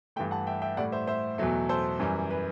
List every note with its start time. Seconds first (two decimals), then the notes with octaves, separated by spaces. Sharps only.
0.16 G2 E3 A3 E5 G5
0.31 F#5 A5
0.47 E5 G5
0.62 E5 G5
0.77 A2 G3 D5 F#5
0.92 C5 E5
1.07 C5 E5
1.38 E2 B2 F#3 A3
1.69 A4 C5
1.99 F#2 E3 G3
2.30 B4